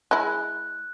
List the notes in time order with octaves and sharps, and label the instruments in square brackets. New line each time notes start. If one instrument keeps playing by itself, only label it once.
[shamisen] G#3 E4 [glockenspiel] F#6